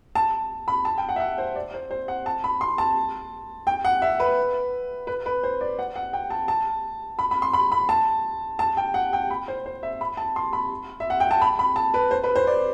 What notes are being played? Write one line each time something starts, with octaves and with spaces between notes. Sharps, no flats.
A5
B5
A5
G5
F#5
E5
F#5
C5
D5
C5
C5
F#5
A5
B5
C6
A5
G5
F#5
E5
B4
B4
B4
C5
D5
F#5
F#5
G5
A5
A5
B5
B5
C6
B5
B5
A5
A5
G5
F#5
G5
B5
C5
C5
E5
B5
A5
C6
B5
E5
F#5
G5
A5
B5
B5
A5
B4
C5
B4
C5
D5